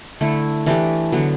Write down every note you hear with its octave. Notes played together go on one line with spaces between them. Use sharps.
D3 A3 E4
E3 A3 D4 G4
D3 F#3 B3